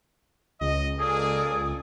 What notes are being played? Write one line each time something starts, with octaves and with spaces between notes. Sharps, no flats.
C#2 D#5
A#3 G#4 A4 D5 G#5 D#6